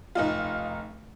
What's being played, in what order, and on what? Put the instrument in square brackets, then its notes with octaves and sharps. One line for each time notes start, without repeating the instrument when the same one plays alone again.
[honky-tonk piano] F1 D#4 F4